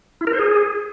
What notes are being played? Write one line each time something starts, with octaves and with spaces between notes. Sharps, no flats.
E4
A#4
C5
G#4